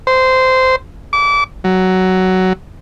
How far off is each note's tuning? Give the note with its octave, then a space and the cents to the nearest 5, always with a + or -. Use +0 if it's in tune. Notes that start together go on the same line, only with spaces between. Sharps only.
C5 -15
D6 -30
F#3 +10